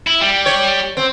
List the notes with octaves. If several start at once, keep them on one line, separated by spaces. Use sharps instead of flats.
E4
G3
C#5
C4